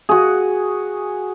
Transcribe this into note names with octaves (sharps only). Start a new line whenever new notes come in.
F#4 G#4